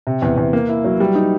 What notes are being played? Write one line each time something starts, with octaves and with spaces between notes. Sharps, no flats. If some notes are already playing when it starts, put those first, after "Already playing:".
C3
E2
E2
A#3
E4
F#3
G3
D#4